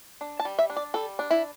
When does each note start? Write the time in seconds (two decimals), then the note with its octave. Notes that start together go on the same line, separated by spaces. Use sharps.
0.21 D4
0.40 A5
0.45 G3
0.59 E5
0.70 D4
0.76 D5
0.94 G3 A4
1.19 D4
1.31 E4